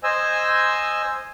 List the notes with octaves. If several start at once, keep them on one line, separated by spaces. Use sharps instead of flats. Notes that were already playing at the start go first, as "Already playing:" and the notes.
C5 D#5 G#5 E6